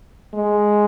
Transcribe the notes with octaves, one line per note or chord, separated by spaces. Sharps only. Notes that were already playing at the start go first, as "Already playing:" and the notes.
G#3